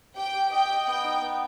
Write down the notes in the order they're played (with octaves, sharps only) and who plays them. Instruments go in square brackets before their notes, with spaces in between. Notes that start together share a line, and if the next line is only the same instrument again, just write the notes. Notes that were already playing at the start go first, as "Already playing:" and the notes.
[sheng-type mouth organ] G4 [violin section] G5
[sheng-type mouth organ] G4
[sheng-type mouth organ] D#5 [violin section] G5
[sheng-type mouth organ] D#5
[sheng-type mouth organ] B3 [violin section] G5
[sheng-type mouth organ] D#4
B3